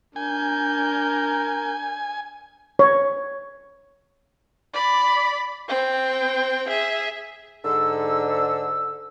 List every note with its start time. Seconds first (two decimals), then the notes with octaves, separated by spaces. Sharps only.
0.16 D4 A#4 G#5 G6
2.79 C#5
4.73 D5 B5
5.68 C4 G5
6.68 G#4 E5
7.64 G#2 D3 E6